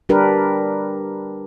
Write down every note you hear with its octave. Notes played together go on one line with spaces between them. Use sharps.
G3 D4 G4 A#4 B4